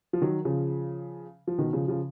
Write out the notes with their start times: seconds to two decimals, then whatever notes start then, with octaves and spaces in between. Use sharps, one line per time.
0.13 F3
0.22 D#3 F#3
0.45 C#3 F3
1.47 F3
1.59 B2 D#3
1.73 C#3 F3
1.88 C#3 F3